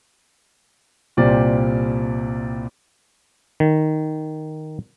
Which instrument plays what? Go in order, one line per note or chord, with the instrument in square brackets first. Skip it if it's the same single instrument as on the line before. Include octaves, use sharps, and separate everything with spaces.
[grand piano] C2 A#2 C4 G4 D5
[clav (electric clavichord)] D#3